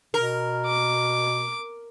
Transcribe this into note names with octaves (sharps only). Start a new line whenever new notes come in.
B2 A#4
D6